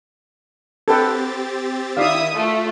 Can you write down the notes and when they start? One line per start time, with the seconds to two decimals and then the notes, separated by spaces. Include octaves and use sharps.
0.88 C4 G4 A4 B4 G5 A6
1.97 D#3 E4 G4 D5 E5 F5 D#6
2.35 A3 F4